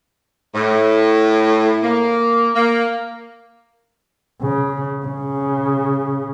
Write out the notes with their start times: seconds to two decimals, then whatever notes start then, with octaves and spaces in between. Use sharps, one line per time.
0.55 A2
1.83 A#3
2.56 A#3
4.42 C#3
5.05 C#3